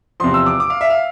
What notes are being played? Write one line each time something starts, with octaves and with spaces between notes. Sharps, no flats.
E2 C3 F3 C6
E6
D6
D6
F5
E5
F5